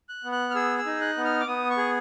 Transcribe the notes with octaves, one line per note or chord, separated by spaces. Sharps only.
F#6
B3
F#6
F6
G#4 E6
E6
D#4
F#6
B3
F6
D6
B3 D#6
C#6
G#4